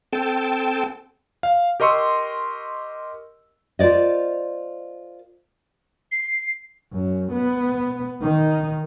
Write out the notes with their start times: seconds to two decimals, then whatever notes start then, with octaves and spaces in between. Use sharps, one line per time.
0.13 C4 A4 G5 A5
1.43 F5
1.80 G4 A#4 D#5 C6 C#6 E6
3.79 F4 A#4 C5 D5 D#5
6.11 C7
6.93 F#2
7.32 B3
8.22 D#3 D#4